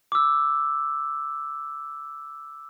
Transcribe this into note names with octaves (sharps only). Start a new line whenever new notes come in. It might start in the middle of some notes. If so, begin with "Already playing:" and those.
D6 E6